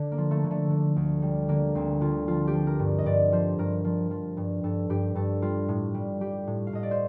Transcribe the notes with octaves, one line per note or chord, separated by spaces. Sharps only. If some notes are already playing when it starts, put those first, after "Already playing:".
Already playing: D3
A#3
F3
A3
D3
A3
D3
D2
G3
D3 A#3
D2 C4
D3 F4
F3 F4
G4
F3
A#4
G2
D#5
G2 D5
F3 C5
G2 A#4
F3
F3
G2
G2 A4
G2 G4
G2 A4
G3 F4
A2
G3
G3 G4
A2
F5
A2 D#5
D5
C5